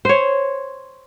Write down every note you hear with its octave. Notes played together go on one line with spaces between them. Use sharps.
C5 C#5